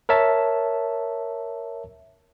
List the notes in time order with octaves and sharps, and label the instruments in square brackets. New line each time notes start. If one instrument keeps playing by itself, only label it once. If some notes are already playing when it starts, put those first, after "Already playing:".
[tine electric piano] A#4 C#5 E5 A5